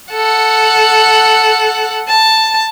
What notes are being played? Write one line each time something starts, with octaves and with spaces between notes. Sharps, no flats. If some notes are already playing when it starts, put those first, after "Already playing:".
A4 F#5
A5